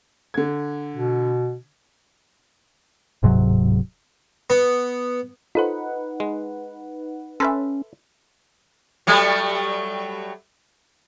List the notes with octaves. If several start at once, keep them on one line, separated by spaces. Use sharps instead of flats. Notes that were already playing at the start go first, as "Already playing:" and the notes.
D3 G#6
B2
D1 G#2 C3 F#3
B3
D#4 F4 A4 B4 C5 F#5
G#3
C#4 A4 B4 E5 C6
F#3 G3 A3